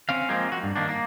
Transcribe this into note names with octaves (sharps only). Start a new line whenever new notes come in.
C4 C#4 F5
F3 G#3 A#3 C4
F4 F#4
G2
D#3 A#3 D4
A#3